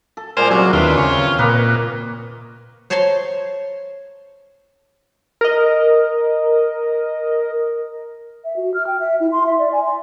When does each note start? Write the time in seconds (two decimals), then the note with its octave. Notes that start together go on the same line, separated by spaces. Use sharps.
0.17 A4
0.37 A#2 G3 G#3 A#4 C5 G#5 F6
0.51 C3 F#3 C#4
0.73 D#2 C3 D4 F4 B4 E5 C6
0.98 C#3 C#5 G5 G#5
1.38 A#2 A#3 B4 D#5
2.90 C5 C#5 A5 A#5 C6
5.41 A#4 D#5
8.44 E5
8.56 F#4
8.74 F6
8.87 G5
9.00 E5
9.20 E4
9.32 C6
9.47 E5
9.59 D5
9.72 G#5
9.85 C6